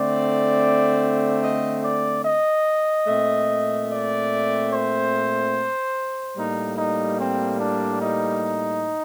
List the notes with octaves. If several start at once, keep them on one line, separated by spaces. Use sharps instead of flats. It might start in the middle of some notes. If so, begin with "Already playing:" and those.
Already playing: D3 A3 C4 D5
D#5
D5
D#5
A#2 A3 C4
D5
C5
A2 G3 A#3 D#4
D#4
C4
D4
D#4